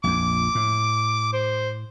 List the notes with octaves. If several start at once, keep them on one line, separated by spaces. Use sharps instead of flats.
A#1 F2 D6
A2
C5